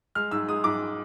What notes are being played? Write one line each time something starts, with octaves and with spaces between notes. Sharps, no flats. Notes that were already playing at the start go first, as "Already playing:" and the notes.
G#3 F6
G#2 E6
G#3 D#6
G#2 D6